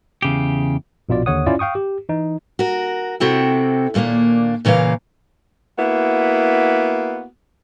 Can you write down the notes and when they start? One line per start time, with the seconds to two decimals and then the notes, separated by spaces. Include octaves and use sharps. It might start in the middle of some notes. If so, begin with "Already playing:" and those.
0.22 E2 C#3 G4
1.09 A#1 B2 F4 D5
1.26 D#2 D3 C#5 F#5 D#6
1.47 C#4 E4 F4 D5
1.59 F5 G5 C#6 D#6
1.75 G4
2.09 E3 D#4
2.59 F#4 A#4
3.20 C3 C4 E4 F#4 A4 G5
3.94 D#2 A#2 A3 A#3 D4
4.65 A#2 C#3 E3 A#3 F5
5.77 A#3 B3 E4 F#4